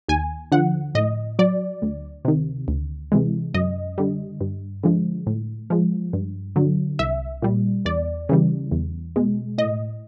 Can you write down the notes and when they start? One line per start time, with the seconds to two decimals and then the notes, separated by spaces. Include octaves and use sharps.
0.08 D#2 G#5
0.52 D3 F3 F#5
0.95 A2 D#5
1.39 F#3 D5
1.82 D2
2.25 C3 D#3
2.68 D2
3.12 C3 E3 G#3
3.54 F#2 D#5
3.98 D3 G3
4.41 G2
4.83 D3 F3 G#3
5.27 A2
5.70 F3 G#3
6.13 G2
6.56 D3 F#3
6.99 C2 E5
7.42 A#2 G3
7.85 E2 D5
8.29 C#3 E3 G3
8.71 E2
9.16 B2 G#3
9.58 A2 D#5